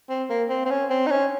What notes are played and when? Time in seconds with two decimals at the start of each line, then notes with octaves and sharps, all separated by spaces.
0.09 C4
0.29 A#3
0.49 C4
0.65 C4
0.70 C#4
0.90 C4
1.07 D#4
1.11 C#4